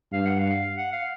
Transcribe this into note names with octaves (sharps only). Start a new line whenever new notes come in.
G2 F5
F#5
F5
F#5
F5